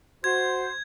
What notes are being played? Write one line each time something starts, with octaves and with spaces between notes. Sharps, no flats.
F#4 C5 G#6